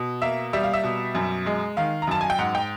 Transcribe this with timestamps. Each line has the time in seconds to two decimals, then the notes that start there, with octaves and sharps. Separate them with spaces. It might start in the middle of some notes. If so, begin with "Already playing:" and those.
Already playing: B2
0.22 A#3 E5
0.53 G3 E5
0.63 F5
0.73 E5
0.84 B2
1.15 F#2
1.46 G#3
1.77 D#3 F5
2.02 A#5
2.07 F#2 A5
2.21 G#5
2.30 G5
2.39 G#2 F#5
2.55 G5